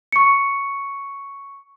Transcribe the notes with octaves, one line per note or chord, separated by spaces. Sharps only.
C#6 C#7